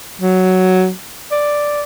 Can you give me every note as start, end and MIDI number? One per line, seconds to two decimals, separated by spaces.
0.21 0.91 54
1.31 1.84 74